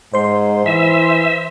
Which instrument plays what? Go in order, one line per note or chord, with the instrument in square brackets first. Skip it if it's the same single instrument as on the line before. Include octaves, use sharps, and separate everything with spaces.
[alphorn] G#2 [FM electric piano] C5 C6
[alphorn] E3 [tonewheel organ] E5